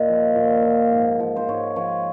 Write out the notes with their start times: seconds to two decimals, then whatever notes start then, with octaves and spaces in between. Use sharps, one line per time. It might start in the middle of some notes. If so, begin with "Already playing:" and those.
Already playing: A#2 D#5
0.08 F3
0.35 A#2
0.63 F3
0.91 G#2
1.20 F3
1.36 C5
1.49 G#2 C#5
1.76 F3 C#5